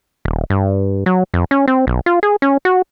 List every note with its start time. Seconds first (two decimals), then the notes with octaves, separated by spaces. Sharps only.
0.25 D#1
0.50 G2
1.06 F#3
1.34 F2
1.51 C#4
1.68 C4
1.87 B1
2.06 F4
2.23 G#4
2.42 C#4
2.65 F#4